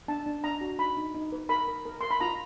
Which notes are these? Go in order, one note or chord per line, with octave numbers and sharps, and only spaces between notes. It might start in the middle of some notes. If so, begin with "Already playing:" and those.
D4 A5
D4
D4 A#5
F#4
D#4 B5
D#4
D#4
B4
A#4 B5
A#4
A#4
A#4 C6
B5
F4 A#5